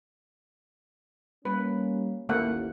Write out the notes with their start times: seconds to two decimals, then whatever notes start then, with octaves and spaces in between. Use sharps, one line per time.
1.45 G3 A#3 C#4 B4
2.29 A1 D#2 A3 A#3 F#5